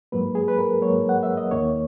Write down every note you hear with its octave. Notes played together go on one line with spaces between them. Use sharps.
G#2 F#3 A#3 B4
G#4
B4
A#4
G#2 F#3 A#3 C#5
F#5
E5
D#5
D#2 D#3 A#3 C#5